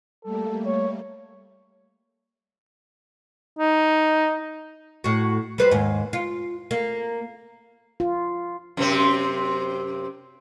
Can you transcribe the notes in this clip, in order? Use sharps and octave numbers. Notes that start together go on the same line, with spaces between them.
G3 A3 A#3 A4
C#5
D#4
A2 F#4
G3 B4 C5
D#2 G#2
F4
A#3
F4
F#2 C3 C4